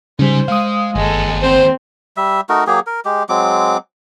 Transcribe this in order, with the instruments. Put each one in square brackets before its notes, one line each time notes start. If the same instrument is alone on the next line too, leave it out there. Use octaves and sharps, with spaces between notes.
[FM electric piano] C#3 G3 [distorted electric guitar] D#4 G#5 [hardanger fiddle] C5
[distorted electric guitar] G#3 [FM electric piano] F5 D#6
[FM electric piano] G1 [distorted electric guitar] D#2 B3 [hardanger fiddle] G#3 A4
[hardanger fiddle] C4 [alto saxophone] C5
[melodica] G3 E5
A3 D#4 F#4 A#4
F#3 A#3 G4 G#4
A#4
G#3 G4
F#3 G#3 C4 D6